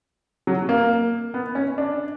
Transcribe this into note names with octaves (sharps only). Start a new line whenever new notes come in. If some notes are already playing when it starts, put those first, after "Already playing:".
F#3
A#3
B3
C#4
D4